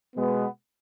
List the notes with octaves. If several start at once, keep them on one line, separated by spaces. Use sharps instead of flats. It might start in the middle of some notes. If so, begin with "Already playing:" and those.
B2 G#3 B3